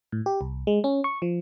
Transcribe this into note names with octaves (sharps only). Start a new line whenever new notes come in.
A2
G4
C2
G#3
C#4
C#6
F3